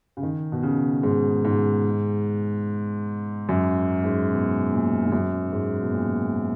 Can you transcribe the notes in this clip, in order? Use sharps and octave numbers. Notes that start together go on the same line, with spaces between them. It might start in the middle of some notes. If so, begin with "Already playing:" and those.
C#3
D#3
B2
C#3
G#2
G#2
F#2
G#2
B2
A#2
G#2
F#2
G#2
B2
A#2